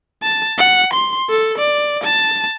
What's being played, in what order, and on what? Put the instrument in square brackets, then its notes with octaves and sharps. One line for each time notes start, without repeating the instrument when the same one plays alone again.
[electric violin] A5
F#5
C6
A4
D5
A5